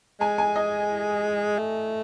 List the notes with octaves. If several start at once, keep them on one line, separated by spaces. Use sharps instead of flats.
G#3 G#5
G#5
D#5
A3